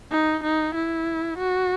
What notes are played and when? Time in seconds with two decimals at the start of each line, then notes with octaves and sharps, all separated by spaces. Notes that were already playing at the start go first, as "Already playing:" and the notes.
0.12 D#4
0.44 D#4
0.75 E4
1.38 F#4